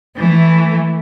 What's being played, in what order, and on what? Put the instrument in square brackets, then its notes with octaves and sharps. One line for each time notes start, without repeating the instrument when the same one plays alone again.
[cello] E3 A3